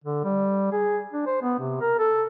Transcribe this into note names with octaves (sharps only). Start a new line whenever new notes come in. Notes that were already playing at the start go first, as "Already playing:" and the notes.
D3
G3
G#4
D4
C5
B3
C3
A#4
A4